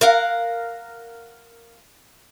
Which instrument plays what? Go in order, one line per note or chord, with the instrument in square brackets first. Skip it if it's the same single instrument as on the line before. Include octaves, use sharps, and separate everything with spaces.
[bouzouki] A#4 F5 F#5